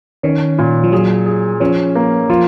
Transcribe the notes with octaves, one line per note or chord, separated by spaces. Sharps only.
D#3 C#4
A#2
F3
F#3 G#4
G#4
F3 C#4
A#3
F3 F4